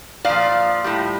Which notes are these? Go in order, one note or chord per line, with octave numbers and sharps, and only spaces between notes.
A#2 F3 D5 F5
A2 G3